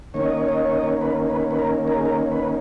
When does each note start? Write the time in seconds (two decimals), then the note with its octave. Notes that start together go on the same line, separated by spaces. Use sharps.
0.14 D#3 A#3 C#4 C#5
0.26 D#5
0.37 C#5
0.48 D#5
0.61 C#5
0.72 D#5
0.84 C#5
1.01 B4
1.30 B4
1.51 B4
1.59 A#4
1.88 A#4
1.97 G#4
2.05 A#4
2.32 B4